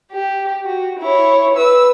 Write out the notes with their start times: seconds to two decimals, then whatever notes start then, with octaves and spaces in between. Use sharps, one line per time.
0.12 G4
0.65 F#4
0.99 E4 C#5
1.55 B4 E6